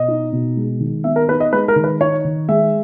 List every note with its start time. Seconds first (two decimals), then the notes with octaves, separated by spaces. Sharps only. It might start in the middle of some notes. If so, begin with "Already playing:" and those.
Already playing: B2 D#5
0.08 D#4
0.33 B2
0.57 G#3
0.80 D#3
1.04 B3 E5
1.16 A#4
1.28 D#4 B4
1.40 D#5
1.53 G#3 B4
1.68 A#4
1.76 D#3
1.84 B4
2.01 D#4 C#5
2.25 D#3
2.49 G#3 E5